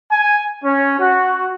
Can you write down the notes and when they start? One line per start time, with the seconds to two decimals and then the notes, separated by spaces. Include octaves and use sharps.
0.12 G#5
0.65 C#4
1.00 F#4